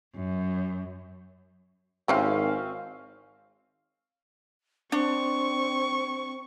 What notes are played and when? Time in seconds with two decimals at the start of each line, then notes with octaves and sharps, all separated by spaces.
0.15 F#2
2.08 G#1 C#3 E3 C4 C#4 G4 F5
4.92 C4 D4 C#6